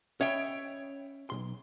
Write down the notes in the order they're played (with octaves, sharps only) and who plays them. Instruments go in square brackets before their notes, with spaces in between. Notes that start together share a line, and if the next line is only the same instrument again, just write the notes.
[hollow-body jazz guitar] C#4 D#5 [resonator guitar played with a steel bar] C#5 E5 G5
[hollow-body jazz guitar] B1 G#2 C6